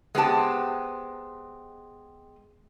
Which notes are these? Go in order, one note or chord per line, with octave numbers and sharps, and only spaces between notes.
G#3 B3 C4 D4 G4 A5